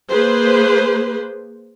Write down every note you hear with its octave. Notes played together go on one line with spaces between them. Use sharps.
A#3 G#4 B4 C5